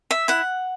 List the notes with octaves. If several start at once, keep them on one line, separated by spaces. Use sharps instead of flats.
E5
E4 F#5